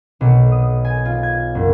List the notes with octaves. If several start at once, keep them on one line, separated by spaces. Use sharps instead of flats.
B1
D#6
G#5
F4
G#6
F#1